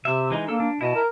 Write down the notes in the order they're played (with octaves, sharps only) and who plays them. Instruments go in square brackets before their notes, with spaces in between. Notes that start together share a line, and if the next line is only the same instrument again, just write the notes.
[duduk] C3 [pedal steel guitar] E5
[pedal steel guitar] E3 G#3 D#4
[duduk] A#3 [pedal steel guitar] D4 A4 E6
[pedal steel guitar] D4
[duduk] B2 [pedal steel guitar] E4 D#5 A5
[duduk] A#4